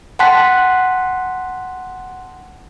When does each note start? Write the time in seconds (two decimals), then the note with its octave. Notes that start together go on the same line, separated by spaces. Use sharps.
0.19 F#5 G5 A5 C6 F#6 B6